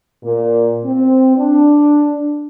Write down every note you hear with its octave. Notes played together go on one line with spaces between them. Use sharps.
A#2
C4
D4